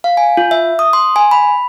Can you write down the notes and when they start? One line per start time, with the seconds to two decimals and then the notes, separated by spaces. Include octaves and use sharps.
0.04 F5
0.17 G#5
0.37 F4
0.51 E5
0.79 D#6
0.93 C6
1.16 G#5
1.31 B5